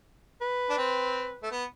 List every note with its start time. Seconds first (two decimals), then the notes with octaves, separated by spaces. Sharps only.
0.41 B4
0.70 D4
0.77 C4
1.43 A3
1.51 B3